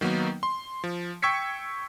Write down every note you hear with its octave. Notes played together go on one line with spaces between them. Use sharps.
D#3 F#3 A#3 B3 D#4
C6
F3
G5 C#6 E6 G#6 B6 C#7